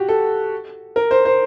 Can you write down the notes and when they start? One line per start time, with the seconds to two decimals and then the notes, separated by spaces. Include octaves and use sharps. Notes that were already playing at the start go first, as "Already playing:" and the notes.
Already playing: F#4 G4
0.08 A4
0.96 A#4
1.11 C5
1.25 C5